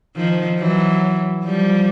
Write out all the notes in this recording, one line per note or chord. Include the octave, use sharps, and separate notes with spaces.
D#3 F3
E3 F#3
F3 G3